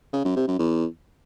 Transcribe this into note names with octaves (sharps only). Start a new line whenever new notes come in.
C#3
F#2
C3
F#2
E2